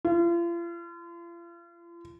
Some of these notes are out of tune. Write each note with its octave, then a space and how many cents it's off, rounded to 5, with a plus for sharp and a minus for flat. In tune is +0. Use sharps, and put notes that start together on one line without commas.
F4 -40